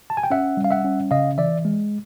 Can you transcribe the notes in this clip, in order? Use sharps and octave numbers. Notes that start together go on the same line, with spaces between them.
A5
G#5
G5
C#4 E5 F#5
G3
F5
E5 F#5
C#4
C#3 D#5 F5
E3 D5 E5
G#3